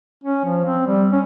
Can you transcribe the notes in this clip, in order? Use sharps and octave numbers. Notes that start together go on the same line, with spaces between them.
C#4
F3
C4
G3
C#4